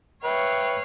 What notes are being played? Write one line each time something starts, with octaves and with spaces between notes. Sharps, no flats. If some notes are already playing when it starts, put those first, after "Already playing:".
B4 C#5 E5 F5 G5